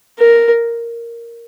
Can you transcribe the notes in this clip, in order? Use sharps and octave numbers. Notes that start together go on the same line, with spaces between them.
A#4